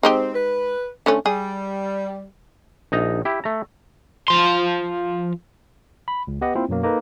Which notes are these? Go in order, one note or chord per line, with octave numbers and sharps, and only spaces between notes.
G#3 C4 D#4 G4
B4
D3 A3 C#4
G3 G#4
A#1 D#4 A#5
E4 G4
A3 A#5
F3 C6
B5
C#2
B3 G4 B4 D#5 F#5
A#3 C4 E4 F4
F#2 B2 F#3 A#3
A#3 D#4 A4 B4